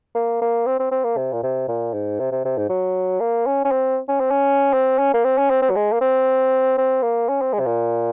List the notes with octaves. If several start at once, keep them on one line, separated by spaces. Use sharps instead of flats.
A#3
A#3
C4
C4
C4
A#3
C3
A#2
C3
A#2
G#2
C3
C3
C3
G#2
F#3
A#3
C#4
C#4
C4
C#4
C4
C#4
C4
C#4
A#3
C4
C#4
C4
C4
F#3
G#3
A#3
C4
C4
A#3
C#4
C4
G#3
C3
A#2